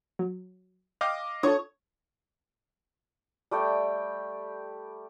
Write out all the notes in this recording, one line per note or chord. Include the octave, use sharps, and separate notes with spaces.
F#3
D#5 F5 G5 D6 F6
D4 F4 A4 C#5 C#6 D#6
G3 A3 G5